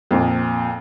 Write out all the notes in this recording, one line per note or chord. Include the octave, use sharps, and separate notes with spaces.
F2 A#2